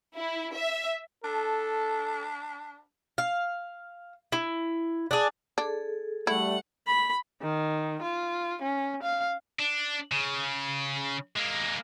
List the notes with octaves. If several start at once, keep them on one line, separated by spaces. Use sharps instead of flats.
E4
E5
D4 A4
F5
E4
D4 G#4
D4 G#4 A4
G3 A3 E4 F#5
B5
D#3
F4
C#4
F5
D4
C#3
G#3 A#3